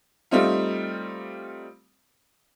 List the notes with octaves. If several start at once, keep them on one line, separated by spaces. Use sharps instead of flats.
G3 A3 C4 D#4 F4